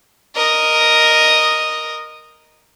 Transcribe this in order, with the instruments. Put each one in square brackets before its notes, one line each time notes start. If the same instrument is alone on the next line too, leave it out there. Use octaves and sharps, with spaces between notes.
[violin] A#4 D#5